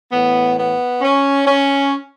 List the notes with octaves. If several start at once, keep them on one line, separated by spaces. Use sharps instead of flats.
A2 E3 B3
B3
C#4
C#4